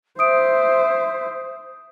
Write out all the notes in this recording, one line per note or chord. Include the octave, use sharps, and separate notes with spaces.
C5 E5 D#6 D7